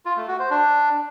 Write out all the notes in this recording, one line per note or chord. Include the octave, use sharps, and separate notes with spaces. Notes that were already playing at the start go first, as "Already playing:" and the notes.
F4
A3
F#4
C5
D4